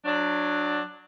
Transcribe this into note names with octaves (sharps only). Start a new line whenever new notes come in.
F#3 D4